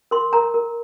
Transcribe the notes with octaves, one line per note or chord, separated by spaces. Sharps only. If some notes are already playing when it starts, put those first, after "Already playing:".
A#4 C6
A#4 A#5
A#4